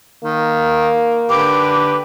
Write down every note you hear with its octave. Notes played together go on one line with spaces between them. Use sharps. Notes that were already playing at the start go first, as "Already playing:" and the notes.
D#3 A#3
D3 G4 B4 D6